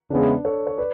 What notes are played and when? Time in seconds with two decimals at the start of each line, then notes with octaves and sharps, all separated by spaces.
0.10 E2 C#3 G#3 B3 D4 E4
0.45 A4 C#5
0.67 C#5
0.78 B4 D5